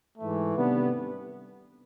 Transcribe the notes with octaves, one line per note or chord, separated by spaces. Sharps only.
G#2 E3 A3
C3 D#3 G3 B3 D4